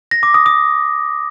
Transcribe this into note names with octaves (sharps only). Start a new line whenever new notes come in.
A#6
D6
D#6
D#6